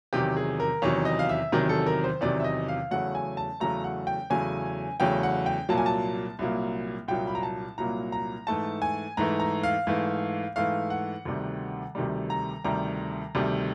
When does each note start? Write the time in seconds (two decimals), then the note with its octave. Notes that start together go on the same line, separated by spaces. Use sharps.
0.13 E2 C3 D#3 F#3 G4
0.37 G#4
0.60 A#4
0.82 E2 C3 D#3 F#3 C#5
1.05 D#5
1.19 F5
1.29 E5
1.52 E2 C3 D#3 F#3 A#4
1.69 A4
1.86 A#4
2.04 C5
2.21 E2 C3 D#3 F#3 D5
2.40 E5
2.44 D#5
2.68 F5
2.91 E2 C#3 F#3 A3 F#5
3.15 G#5
3.37 A5
3.60 E2 C#3 F#3 A3 A#5
3.84 F#5
4.07 G5
4.30 E2 C#3 F#3 A3 G#5
5.00 E2 C#3 F#3 A3 G5
5.23 F#5
5.46 G5
5.69 C2 A#2 F#3 A#3 A5
5.78 G#5
5.86 A5
6.39 C2 A#2 F#3 A#3
7.08 C2 A#2 F#3 A#3 G5
7.27 B5
7.35 A#5
7.43 A5
7.78 C2 A#2 F#3 A#3 A#5
8.12 A#5
8.47 G#2 E3 A3 A5
8.82 G#5
9.17 G#2 E3 A3 A#5
9.40 A#5
9.63 F5
9.87 G#2 E3 A3
10.56 G#2 E3 A3 F5
10.90 F#5
11.25 D2 C3 D#3 G3
11.95 D2 C3 D#3 G3
12.30 A#5
12.64 D2 C3 D#3 G3 A#5
13.35 D2 C3 D#3 G3